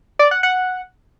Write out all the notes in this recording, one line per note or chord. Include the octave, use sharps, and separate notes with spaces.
D5
F#5
F#5